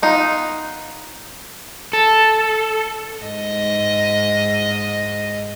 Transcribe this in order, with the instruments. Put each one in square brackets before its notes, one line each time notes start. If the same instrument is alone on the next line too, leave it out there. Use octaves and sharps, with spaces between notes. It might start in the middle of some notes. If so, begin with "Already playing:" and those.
[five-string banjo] B3 D#4 F4
[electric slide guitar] A4
[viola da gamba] G#2 D#5